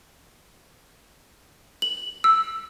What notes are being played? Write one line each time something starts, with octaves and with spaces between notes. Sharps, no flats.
F#7
E6